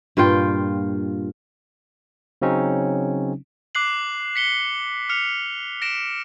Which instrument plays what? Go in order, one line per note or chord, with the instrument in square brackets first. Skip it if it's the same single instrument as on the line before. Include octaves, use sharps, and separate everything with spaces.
[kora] G2 A#2 F4 G5
[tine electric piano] C#3 F#3 C4 C#4 D#4
[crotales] D6 F#6 C7 F#7
B6 C#7 G7
F6 C#7 F7
A#6 D7 E7